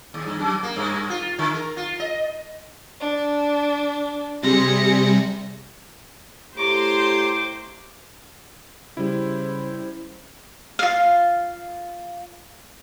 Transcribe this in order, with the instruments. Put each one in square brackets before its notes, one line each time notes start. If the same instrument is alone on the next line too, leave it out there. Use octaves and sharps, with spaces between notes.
[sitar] D#2
G2
F#2
A#3
G2
F4
D3
A#4
F4
D#5
[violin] D4
[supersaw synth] C3 G3 [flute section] G#4 E5 C6 [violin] A#6 C#7
[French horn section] A3 E4 G4 [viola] C5 [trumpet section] C#5 A#5 C6 [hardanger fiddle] D6
[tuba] C#3 [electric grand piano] G3 E4 [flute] C5
[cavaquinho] F4 F5